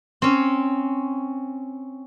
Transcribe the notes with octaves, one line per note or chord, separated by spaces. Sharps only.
C4 C#4